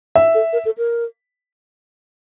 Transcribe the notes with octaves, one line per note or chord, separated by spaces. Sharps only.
E5
A4
A#4
A4
A#4